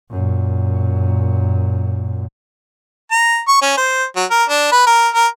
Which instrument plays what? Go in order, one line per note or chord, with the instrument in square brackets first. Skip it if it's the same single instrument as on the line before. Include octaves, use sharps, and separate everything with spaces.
[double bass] F#2 A#2
[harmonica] A#5
C#6
C#4
C5
F#3
A#4
D4
B4
A#4
A#4